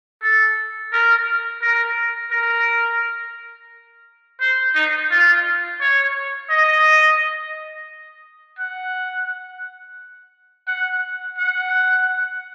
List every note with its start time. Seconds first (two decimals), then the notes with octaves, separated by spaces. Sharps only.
0.22 A4
0.93 A#4
1.62 A#4
2.31 A#4
4.41 C5
4.75 D#4
5.11 F4
5.81 C#5
6.50 D#5
8.59 F#5
10.68 F#5
11.38 F#5